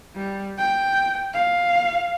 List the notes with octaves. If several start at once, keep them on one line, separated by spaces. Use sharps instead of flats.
G3
G5
F5